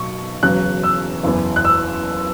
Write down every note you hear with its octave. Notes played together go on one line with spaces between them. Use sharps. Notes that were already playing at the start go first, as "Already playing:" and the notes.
Already playing: B1 B2 F#3 C#6
E1 E2 C#3 F#3 C#4 F#6
E6
F#1 E2 E3 B3
F#6
E6